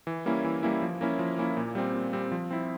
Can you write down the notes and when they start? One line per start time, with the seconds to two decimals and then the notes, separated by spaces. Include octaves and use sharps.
0.07 E3
0.26 G3 A#3 C#4 E4
0.44 E3
0.63 G3 A#3 C#4 E4
0.82 F3
1.01 A#3 C#4 E4
1.19 F3
1.38 A#3 C#4 E4
1.57 A#2
1.75 G3 C4
1.94 A#2
2.13 G3 C4
2.32 F3
2.51 C4 E4